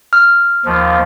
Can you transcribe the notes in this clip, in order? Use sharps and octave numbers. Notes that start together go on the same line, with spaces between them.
F6
D#2 F3